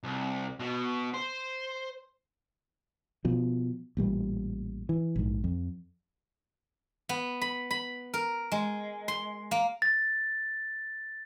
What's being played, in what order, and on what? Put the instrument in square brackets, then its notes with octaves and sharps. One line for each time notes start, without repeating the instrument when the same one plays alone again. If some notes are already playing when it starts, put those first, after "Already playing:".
[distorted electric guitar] C2
B2
C5
[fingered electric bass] B2 F3
A1 A#2 G3
E3
A#1 G#2
F2
[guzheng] B3
B5
B5
A#4
G#3
C6
A#3
[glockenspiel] A6